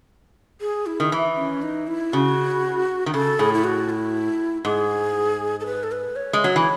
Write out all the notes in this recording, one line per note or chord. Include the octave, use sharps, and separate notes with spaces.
G#4
E4
D#3
E3
C#4
D#4
E4
C#3 F#4
D#3
C#3 A4
A2 G#4
E4
F#4
E4
G#2 G#4
A4
B4
A4
B4
C#5
G#3
F#3
E3